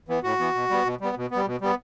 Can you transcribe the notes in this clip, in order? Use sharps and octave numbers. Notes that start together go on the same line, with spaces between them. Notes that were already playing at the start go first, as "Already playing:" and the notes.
E3 B3
A2 F#4
E3 B3
B2
G3 B3
B2
G3 B3
B2
B3
G3
B2
G3 B3